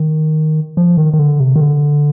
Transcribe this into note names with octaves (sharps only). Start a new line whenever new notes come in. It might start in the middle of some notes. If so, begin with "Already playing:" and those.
Already playing: D#3
F3
D#3
D#3
D3
C3
D#3
D3